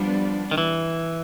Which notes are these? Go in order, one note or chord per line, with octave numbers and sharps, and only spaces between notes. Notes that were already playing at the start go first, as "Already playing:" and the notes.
Already playing: F3 G3 B3 D4
D#3
E3